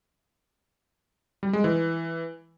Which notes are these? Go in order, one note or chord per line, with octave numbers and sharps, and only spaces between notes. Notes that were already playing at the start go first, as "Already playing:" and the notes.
G3
G#3
E3